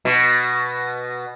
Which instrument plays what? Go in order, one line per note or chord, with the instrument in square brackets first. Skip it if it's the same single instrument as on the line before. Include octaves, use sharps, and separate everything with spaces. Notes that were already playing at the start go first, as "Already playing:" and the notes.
[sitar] B2